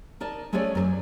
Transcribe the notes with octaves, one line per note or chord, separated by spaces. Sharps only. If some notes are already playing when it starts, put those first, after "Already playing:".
D#4 A#4 D5 A5
G#3 A3 C#4 G#4 C#5 D5
F#2 A#4 D5